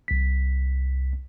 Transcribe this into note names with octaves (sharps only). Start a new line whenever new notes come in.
C2 B6